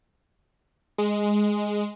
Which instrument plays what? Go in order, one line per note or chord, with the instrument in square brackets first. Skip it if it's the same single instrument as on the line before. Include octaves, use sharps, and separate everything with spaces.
[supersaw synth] G#3